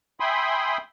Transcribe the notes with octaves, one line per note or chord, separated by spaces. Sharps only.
E5 G5 G#5 B5 C6 D#6